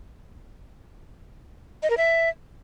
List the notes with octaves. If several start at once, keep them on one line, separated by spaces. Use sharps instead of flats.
D#5
A#4
E5